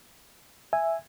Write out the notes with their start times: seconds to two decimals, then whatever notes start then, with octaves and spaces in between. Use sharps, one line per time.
0.73 E5 G#5